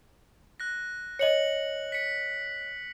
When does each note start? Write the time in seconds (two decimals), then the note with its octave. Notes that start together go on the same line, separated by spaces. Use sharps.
0.60 F#6 A#6
1.19 C#5 D#5 C#7 F#7
1.92 B6 C#7